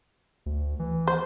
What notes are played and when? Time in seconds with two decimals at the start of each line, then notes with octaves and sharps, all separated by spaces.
0.46 D2
0.79 E3
1.07 C5